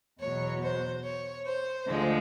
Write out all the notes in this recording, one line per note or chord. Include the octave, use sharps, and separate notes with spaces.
E2 B2 F#3 C#5
C5
C#5
C5
D2 D3 F3 G#3